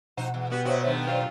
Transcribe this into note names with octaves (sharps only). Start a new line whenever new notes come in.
B2 F3 D#4 C5 F#5
E2
G3 B3 F#4
A#2 F#4 C5 C#5 E5
G2 D#3 A3
F#3 F4 C5 D5